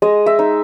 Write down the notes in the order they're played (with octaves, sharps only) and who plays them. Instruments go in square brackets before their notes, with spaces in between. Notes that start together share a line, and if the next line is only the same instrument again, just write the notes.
[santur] G#3 D#5
E5
D#4